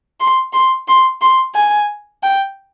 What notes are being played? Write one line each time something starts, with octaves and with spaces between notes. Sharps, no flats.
C6
C6
C6
C6
G#5
G5